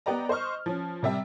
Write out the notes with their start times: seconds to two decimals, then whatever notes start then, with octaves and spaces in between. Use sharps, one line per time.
0.06 B3 G4 D5 D#5 A#5
0.29 C5 D#5 C#6 F6
0.66 F3 C#4
1.03 C3 G3 E5